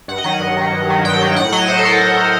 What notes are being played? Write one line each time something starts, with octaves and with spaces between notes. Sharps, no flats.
G2 F#5
D#5
D#3 F#3 F#5
G2
D#3 F#3
G2
D#3 F#3
G2 G5
D#3 F#3
A2 F#5
F#3 D#5
A2 C5
A4
F#3 A#4
A2
F#3